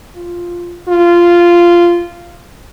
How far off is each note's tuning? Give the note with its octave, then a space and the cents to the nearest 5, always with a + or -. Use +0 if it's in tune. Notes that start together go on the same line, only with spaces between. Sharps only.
F4 +0
F4 -10